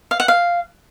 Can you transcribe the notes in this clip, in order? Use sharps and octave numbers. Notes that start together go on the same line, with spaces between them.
F5
F#5
F5